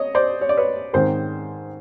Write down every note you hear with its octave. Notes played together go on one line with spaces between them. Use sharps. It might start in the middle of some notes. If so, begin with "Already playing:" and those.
Already playing: C#5 D#5
C5 D5
C#5
D5
B4 C#5
G#2 D#3 G#3 C4 A#4 C5